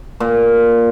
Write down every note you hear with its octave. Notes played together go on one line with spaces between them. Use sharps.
A#2